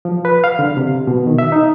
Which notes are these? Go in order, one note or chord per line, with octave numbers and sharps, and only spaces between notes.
F3
B4
F5
D3
C3
B2
D#3
E5
D#4